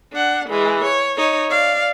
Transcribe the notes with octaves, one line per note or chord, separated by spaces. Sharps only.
D4 F#5
E3 G#3
C#5
D#4 C#5
D5 F5